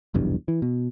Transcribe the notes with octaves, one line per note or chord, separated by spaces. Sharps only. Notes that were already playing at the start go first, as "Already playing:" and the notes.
F1 B1 E2 G2
E3
B2